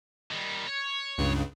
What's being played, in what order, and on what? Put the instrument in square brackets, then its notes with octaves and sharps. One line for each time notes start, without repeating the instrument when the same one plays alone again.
[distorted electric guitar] D#3 G3
C#5
[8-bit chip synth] C#2 G2 C#3